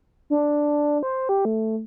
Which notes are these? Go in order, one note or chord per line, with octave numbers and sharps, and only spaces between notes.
D4
C5
G4
A3